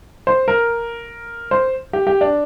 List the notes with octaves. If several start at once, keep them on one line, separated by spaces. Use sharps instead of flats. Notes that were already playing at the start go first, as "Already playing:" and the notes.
C5
A#4
C5
G4
G4
D4